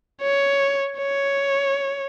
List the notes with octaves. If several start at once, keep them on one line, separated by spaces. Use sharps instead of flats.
C#5
C#5